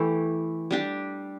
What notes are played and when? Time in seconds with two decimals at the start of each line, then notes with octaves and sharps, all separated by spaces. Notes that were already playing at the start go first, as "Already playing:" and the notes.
Already playing: E3 A3 G4
0.71 G3 D4 G4